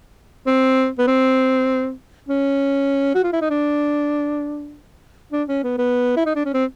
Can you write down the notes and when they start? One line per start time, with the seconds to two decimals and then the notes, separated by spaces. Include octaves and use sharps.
0.47 C4
0.99 B3
1.07 C4
2.28 C#4
3.14 F#4
3.23 F4
3.32 E4
3.41 D#4
3.50 D4
5.32 D4
5.48 C#4
5.63 B3
5.78 B3
6.17 E4
6.26 D#4
6.35 D4
6.45 C#4
6.54 C4